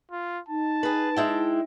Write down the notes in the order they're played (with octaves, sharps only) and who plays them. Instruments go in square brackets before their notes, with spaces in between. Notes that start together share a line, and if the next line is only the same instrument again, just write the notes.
[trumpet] F4
[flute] D#4 [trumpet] A5
[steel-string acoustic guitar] G#4 B4
G#3 E4 G5